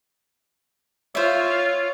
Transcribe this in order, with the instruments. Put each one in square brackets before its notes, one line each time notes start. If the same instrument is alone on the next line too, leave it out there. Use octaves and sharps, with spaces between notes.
[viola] F4 [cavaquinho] C5 E5 [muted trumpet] C#5